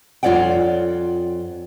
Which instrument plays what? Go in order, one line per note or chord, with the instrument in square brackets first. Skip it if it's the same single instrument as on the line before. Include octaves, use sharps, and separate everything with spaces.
[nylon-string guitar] F2 F4 C#5 D5 F#5 G5